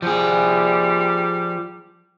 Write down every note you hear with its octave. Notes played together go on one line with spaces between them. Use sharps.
F3 G3 G#4